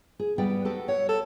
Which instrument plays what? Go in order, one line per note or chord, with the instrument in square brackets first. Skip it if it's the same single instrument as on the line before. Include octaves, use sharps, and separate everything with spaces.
[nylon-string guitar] G#4
[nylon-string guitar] G3 D5 G5 [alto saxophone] B3
[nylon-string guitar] F#4 G4 A4
[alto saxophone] C#5 [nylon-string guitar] F#5
[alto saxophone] A4